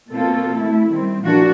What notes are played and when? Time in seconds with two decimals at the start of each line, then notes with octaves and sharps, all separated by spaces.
0.11 B2 A#3 C4 F4 A4
0.58 A3 E4
0.88 D#3 G3 C4
1.22 A#2 E3 F3 D4 F#4 A#4